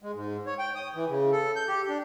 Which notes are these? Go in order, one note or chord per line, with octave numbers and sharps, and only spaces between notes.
G#3
G#2
C#5
G5
D#6
E3
C#3
A4
G6
G4
D4